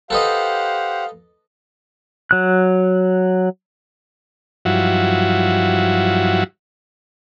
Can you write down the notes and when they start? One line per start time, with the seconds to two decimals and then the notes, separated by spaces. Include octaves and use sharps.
0.10 G4 A4 B4 C5 D#5 F5 F#5
2.31 F#3 F#6
4.65 G2 F3 F#3 E4 F#4